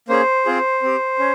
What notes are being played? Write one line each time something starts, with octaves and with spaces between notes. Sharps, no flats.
A#3 C#4 G#4 C5
C4 F4 G#4
C4 G4
C#4